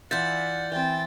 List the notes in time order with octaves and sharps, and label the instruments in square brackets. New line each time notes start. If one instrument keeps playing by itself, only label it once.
[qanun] E3 E5 [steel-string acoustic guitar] D4 F4 [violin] F#5 [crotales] G6 A6
[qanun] E3 C4 [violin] G5 A6